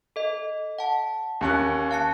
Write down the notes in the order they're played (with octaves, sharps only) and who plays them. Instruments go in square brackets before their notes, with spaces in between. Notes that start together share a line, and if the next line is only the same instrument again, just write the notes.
[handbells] A4 D#5
F#5 A5
[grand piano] D#2 C#4 F#6
[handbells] F5 A5 C#7